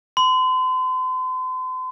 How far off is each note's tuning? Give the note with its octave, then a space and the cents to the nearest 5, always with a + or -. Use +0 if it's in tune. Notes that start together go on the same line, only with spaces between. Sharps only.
C6 -40